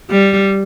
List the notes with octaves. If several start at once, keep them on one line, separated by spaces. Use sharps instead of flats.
G3